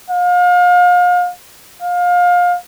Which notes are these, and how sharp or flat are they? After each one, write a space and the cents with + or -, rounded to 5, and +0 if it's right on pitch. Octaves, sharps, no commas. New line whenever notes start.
F5 +35
F5 +25